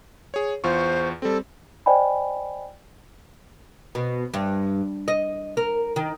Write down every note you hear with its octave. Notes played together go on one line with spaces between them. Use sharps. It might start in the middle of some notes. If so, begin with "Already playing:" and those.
G#4 C#5
E2 F4 C5 C#6
G3 C4 A4
C5 D5 D#5 G5 G#5 B5
B2
G2
D#5
A#4
D#3